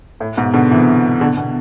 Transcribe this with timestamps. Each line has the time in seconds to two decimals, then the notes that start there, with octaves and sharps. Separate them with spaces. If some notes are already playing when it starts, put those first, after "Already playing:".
0.20 A2
0.37 G#2 B2
0.54 B2 D3
0.71 C3 E3
1.21 B2 D3
1.37 B2